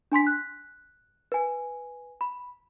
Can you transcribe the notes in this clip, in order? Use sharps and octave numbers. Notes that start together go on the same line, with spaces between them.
D4 G#5 C6 B6
F#6
B4 G#5
B5